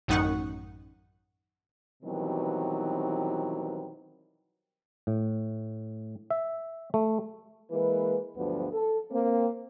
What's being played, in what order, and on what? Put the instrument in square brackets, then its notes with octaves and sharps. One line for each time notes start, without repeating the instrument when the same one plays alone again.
[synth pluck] A1 F#2 D#3 D#4 F#5 C#6
[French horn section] B2 D#3 E3 F#3 G3 C4
[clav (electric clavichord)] A2
E5
A3
[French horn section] E3 G#3 A#3 B4
D2 G2 F3 F#3 B3
A4
A#3 C4